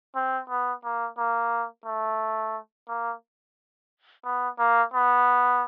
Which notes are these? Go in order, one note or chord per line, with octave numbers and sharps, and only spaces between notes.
C4
B3
A#3
A#3
A3
A#3
B3
A#3
B3